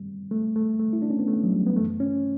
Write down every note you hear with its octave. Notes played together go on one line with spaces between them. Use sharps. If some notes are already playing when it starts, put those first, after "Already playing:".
Already playing: G2 D3 G3
A3
A3
A3
E4
D4
C#4
B3
A3
F#3
G3
B3
F#2 E3 A3
C#4